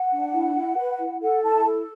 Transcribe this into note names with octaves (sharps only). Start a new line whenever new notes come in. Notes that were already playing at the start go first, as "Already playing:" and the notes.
Already playing: F#5
D4
E4
E4
B4
E4
A4 F#5
E4 A5
A4